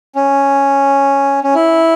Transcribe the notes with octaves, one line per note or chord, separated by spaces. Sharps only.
C#4
C#4
E4